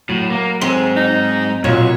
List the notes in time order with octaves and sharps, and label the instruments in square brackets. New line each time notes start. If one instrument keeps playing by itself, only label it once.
[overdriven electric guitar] A2 [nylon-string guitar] F#3
[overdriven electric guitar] A#3
[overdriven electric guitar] G#2 G#3 [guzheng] C4
[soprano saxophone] D#4
[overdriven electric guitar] B1 [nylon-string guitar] A#2 [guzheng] F#3 [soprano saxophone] C#5